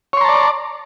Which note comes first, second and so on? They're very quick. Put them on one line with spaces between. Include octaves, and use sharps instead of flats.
C#5 C6 A#5 A5 D5